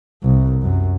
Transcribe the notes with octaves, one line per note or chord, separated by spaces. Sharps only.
C2
F#2